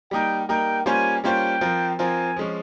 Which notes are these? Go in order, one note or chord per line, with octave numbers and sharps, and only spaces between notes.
G3 A#3 D#4 A#4 G5
G3 A#3 D#4 A#4 G5
G3 A#3 C#4 F4 C5 G#5
G3 A#3 C#4 F4 C5 G5
F3 C4 F4 A#4
F3 C4 F4 A#4 G#5
F3 G#3 C#4